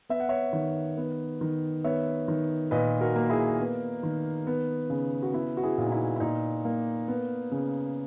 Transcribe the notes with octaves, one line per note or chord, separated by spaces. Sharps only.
B3 E5
F#5
C#5 E5
D#3
B3
D#3
B3 C#5 E5
D#3
A#2 B4 D#5
F#4 A#4
A#3
E4 G#4
B3
D#3
B3
C#3
F#4
B3 E4
F#4
E4 G#4
A#2
D#4
E4
E4
A#2 D#4
A#3
B3
C#3